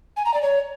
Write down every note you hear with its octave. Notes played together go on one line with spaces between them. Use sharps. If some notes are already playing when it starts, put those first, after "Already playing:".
G#5
A#5
D5
C#5